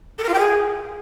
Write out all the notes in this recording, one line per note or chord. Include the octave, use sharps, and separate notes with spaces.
A4
A#4
F4
G5
G#4